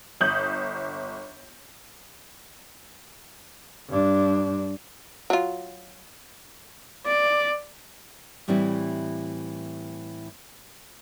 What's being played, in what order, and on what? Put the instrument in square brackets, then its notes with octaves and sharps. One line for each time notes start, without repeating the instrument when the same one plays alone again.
[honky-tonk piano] G1 D#6 G6 F#7
[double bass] G2 D4
[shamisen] F#3 F4
[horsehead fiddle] D5
[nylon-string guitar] A2 E3 G3 C4 E4